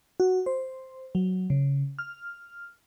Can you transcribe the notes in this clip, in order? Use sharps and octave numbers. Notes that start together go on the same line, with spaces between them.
F#4
C5
F#3
C#3
F6